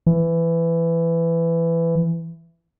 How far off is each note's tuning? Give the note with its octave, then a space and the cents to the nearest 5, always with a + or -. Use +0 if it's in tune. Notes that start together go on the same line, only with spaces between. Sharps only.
E3 +15